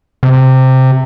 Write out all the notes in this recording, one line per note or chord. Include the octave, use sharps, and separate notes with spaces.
C3